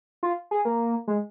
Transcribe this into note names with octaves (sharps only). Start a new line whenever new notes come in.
F4
G#4
A#3
G#3